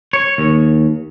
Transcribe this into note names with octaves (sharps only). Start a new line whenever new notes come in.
C#5
D#2